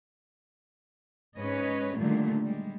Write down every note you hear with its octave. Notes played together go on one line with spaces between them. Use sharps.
G#2 C#4 B4 C#5 D#5
A#2 D3 D#3 F#3 G3 A3
G3 G#3